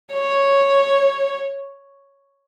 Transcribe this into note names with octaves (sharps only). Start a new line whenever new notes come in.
C#5